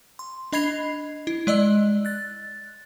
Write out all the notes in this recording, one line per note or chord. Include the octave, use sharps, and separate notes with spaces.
C6
D4 D#5 B5 G#6 C7 F7
E4
G#3 D5 D#5 E6
F#6 A6